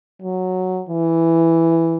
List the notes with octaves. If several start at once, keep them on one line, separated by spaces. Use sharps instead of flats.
F#3
E3